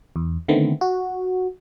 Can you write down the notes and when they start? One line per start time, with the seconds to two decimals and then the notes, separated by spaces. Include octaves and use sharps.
0.16 E2
0.48 D3 D#3 A3 B3 C4
0.81 F#4